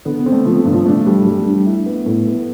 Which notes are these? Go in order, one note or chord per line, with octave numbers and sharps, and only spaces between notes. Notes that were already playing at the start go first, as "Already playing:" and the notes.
D3 B3
B3
C4
A3
F3 C4
F3
G2
F3
A3 D4
G3
G3
D4
E4
B3
A2
B3